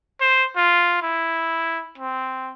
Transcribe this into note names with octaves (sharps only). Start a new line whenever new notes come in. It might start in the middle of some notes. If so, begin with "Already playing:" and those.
C5
F4
E4
C4